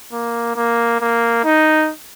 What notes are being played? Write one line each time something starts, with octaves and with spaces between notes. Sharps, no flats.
A#3
A#3
A#3
D#4